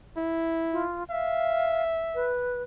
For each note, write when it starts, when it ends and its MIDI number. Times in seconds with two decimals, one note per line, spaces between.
0.17 0.84 64
0.72 1.04 65
1.11 2.31 76
1.11 1.82 77
2.15 2.62 71